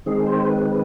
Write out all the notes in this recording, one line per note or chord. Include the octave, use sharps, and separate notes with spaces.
D#3 G#3 C4 G#4
C5
B4
B4